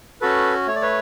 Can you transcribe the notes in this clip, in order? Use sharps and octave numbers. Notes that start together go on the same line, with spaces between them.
C#4 F#4 A4 B4
A3 C#5
D5
B4 C#5